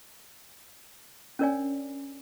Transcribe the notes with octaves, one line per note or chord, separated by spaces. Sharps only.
C#4 D4 A#4 C#5 D5 G#5